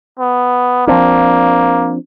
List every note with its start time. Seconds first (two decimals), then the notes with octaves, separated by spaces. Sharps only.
0.19 B3
0.87 F3 A#3 C4 D4